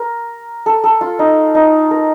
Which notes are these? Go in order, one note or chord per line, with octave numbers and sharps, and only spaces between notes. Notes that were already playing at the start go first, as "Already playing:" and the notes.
Already playing: A#4
A4
A4
F4
D#4
D#4
A#4